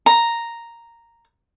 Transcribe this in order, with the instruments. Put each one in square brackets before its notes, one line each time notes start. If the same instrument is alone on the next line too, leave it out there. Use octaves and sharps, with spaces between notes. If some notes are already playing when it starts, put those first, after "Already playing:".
[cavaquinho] A#5